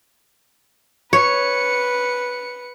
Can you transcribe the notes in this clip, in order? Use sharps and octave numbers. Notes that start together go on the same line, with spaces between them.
B4 C#5 C#7